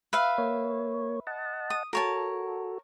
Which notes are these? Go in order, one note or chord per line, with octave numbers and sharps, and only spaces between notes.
B4 E5 F5
A#3 C#5
D#5 F#5 A5
D#6
F#4 A4 A#4 C#5 A5